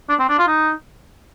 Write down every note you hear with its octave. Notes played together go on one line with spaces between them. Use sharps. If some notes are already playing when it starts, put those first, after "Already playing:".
D4
C4
D4
F4
D#4